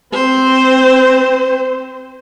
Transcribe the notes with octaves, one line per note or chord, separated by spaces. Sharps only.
C4 C5